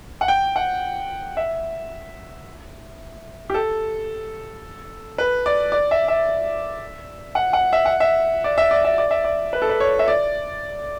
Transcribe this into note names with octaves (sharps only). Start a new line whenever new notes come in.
F#5
G5
F#5
E5
G4
A4
B4
D5
D5
E5
E5
F#5
F#5
E5
F#5
E5
D5
E5
D5
E5
D5
E5
D5
B4
A4
B4
C#5
E5
D5